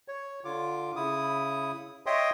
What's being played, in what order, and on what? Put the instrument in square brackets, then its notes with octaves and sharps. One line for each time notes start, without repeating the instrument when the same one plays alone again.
[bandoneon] C#5
D3 F4 D6
C#3 E4 D#6
C#5 D#5 E5 G5 C6 D#6